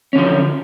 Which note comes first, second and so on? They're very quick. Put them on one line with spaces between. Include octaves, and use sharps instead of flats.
C#4 D3 F3